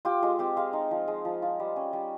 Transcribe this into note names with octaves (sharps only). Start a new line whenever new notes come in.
F4 G4
G#3 F4
C4 G4
G#3 F5
D#4
F3
G#3
F3
F4
G3
C#4
G3